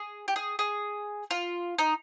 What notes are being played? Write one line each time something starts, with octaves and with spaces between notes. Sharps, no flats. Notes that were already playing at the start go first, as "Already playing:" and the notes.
Already playing: G#4
G4
G#4
G#4
F4
D#4